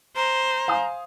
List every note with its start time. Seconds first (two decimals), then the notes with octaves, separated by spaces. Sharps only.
0.16 C5 A#5
0.68 F5 G#5 D#6